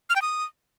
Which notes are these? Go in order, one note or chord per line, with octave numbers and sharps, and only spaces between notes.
F6
G5
D#6